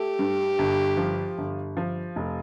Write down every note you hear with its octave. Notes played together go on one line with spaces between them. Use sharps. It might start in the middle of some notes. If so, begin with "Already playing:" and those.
Already playing: A3 G4
G2
G1
F3
G1
F3
F1